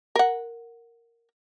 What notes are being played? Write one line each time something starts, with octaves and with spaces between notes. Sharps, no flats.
A#4 F#5